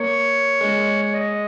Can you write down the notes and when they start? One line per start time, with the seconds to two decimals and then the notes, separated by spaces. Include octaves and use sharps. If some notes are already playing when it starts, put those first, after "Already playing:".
Already playing: A#3 C#5
0.61 G#3
1.02 C#5
1.14 D#5